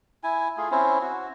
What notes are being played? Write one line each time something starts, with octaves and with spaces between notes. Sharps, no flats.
E4 G#5
A3 F4 G#4
C4 C#4 E4
F#4